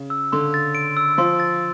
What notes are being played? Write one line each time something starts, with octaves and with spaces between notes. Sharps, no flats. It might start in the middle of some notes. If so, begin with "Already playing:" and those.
Already playing: C#3
E6
D3 C6
A6
D7
E6
F3 C6
A6